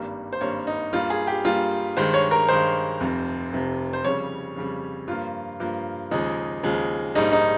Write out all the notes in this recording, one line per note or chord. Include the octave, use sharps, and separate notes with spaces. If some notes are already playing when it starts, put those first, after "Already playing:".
Already playing: G#1 G2 G3 A#3
C5
G#1 G2 G3 A#3 C#5
D#4
G2 G3 A#3 F4
G#4
G4
G2 G3 A#3 F4
G2 D#3 G#3 C5
C#5
A#4
G2 D#3 G#3 C5
F1 F2 C3
F1 F2 C3
C5
F2 C#3 G3 C#5
F2 C#3 G3
G2 F3 A#3 F4
G2 F3 A#3
D#2 C#3 F3 G#3 D#4
D#2 C#3 F3 G#3
A#1 G#2 G3 A#3 D#4
D#4